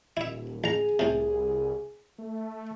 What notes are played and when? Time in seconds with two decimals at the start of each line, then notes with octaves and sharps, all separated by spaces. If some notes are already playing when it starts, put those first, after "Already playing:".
0.17 D#1 E4 E5
0.64 A1 G#4 A#5
0.99 C2 A2 C3
2.18 A3